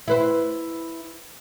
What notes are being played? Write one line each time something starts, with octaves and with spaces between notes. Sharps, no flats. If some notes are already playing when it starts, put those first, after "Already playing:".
E4 B4 C5